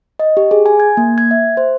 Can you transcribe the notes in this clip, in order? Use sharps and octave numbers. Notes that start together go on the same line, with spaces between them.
D#5
G4
G#4
G#5
G#6
A#3
G#6
E5
C5